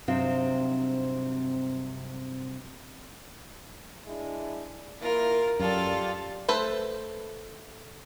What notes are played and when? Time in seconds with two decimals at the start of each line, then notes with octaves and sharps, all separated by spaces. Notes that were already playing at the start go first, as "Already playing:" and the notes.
0.08 G2 C3 F#3 C4 D#4 F5
4.07 G#3 D4 E4
5.02 A#3 E4 F4 A#4
5.60 F#2 F4 G4 A4 D5
6.48 A3 A4 B4 C5